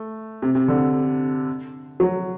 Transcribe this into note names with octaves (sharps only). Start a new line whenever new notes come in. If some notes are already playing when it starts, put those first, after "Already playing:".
Already playing: A3
C3
C3
D3
F#3